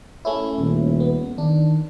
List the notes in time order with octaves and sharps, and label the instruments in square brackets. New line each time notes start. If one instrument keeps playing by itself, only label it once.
[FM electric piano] A3 C#4 E4
[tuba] D#1
[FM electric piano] B3
[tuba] D#3 [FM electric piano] D4